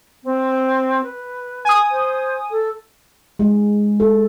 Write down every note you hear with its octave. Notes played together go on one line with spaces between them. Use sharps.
C4
B4
G#5 D#6
C5
A4
G#3
A4